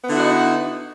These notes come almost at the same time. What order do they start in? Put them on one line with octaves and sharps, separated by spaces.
B3 D3 E4 F#4 D#4